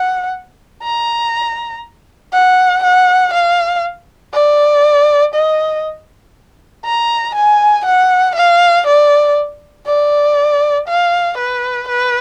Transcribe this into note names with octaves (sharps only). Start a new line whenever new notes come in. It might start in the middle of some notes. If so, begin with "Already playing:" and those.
Already playing: F#5
A#5
F#5
F#5
F5
D5
D#5
A#5
G#5
F#5
F5
D5
D5
F5
B4
B4